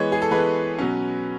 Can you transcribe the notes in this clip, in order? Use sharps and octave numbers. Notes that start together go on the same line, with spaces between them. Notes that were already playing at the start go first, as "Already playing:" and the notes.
Already playing: E3 G#3 B3 C#5
G#4
A4
E3 G#3 B3 B4
B2 F#3 C#4